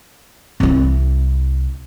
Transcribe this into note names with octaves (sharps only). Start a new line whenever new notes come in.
C2 E4